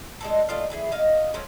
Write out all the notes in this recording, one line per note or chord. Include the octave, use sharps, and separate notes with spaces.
G#3 D4 A4
A3 F4 D5 D#5
E3 E4 G#4
D#5 F5
F3 F#3 A3 C#4